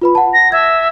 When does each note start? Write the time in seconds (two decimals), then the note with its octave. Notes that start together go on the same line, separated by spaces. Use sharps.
0.02 F4 B4 B5
0.15 F#5 A5
0.34 A#6
0.52 E5 G#6